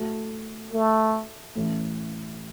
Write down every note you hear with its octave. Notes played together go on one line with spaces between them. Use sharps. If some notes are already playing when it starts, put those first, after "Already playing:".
Already playing: A2 A3 F#4 A4
A3
A1 A2 E3 A3 C#4